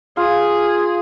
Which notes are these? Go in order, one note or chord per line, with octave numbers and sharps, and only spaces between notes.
F4 G#4